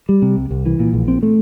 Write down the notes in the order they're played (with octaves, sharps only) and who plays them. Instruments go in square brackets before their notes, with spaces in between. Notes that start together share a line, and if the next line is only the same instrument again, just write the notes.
[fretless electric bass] G3
C3
C2
C2
E3
A#2
A#1
C4
A3